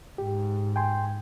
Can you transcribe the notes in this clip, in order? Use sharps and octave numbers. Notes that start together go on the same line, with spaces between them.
G#2 G4
G5 G#5 C6